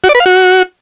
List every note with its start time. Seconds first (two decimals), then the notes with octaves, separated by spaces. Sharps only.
0.04 F#4
0.09 D5
0.15 B4
0.20 F5
0.26 F#4